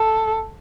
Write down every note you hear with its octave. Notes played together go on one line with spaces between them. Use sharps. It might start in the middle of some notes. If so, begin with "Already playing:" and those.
Already playing: A4